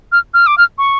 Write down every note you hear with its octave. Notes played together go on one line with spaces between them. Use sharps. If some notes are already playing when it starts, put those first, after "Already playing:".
F6
F6
D6
F6
C#6